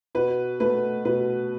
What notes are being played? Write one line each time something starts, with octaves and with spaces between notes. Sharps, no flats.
B2 B4
A3 B4
B2 B4